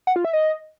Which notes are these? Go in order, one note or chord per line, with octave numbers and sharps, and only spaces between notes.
F#5
F4
E5
D#5